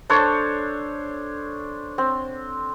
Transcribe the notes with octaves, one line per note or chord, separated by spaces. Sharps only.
D4 A4 C5 C#5
C4